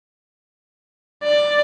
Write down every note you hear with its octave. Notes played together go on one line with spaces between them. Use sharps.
D5